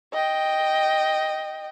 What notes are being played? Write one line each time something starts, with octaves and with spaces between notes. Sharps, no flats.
D#5 G5